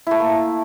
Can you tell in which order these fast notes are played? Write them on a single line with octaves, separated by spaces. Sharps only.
E4 A3 A4 A#3